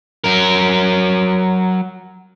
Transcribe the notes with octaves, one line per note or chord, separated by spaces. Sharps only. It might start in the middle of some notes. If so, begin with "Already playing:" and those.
F#3 A#4